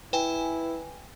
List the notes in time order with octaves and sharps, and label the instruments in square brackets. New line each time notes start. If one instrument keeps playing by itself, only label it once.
[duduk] E4 [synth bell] B4 G5 G#5